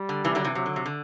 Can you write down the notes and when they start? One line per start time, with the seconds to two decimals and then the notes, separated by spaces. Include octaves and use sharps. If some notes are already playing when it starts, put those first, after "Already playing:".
Already playing: G3
0.09 D3
0.24 C3 E3
0.35 D3 F#3
0.44 C3 E3
0.55 C3 F#3
0.66 D3
0.76 C3
0.86 D3